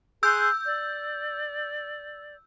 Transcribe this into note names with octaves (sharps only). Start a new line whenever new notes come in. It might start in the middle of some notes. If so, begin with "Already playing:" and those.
G#4 C6 E6 F#6 G6
D5